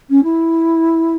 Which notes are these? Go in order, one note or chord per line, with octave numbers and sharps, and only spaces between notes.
C#4
E4